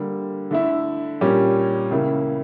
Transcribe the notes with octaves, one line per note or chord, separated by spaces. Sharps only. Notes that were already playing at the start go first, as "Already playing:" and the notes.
Already playing: D3 G3 A#3
D3 A3 E4
A#2 G3 C#4 G4
C#2 C#3 E3 A#3 E4